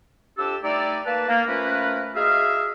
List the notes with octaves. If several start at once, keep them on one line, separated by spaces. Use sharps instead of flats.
F2 D4 G4 A4 E6
G3 A3 D#4 E4 D5
A#3 B4 A5
A#3
F3 A3 C#4 A#4 B4
D#4 F#4 G#4 E5 F5